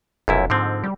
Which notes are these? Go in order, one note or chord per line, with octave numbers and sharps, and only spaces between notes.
F1 B1 F#2 E4
G#2 D3 F3 C4
G3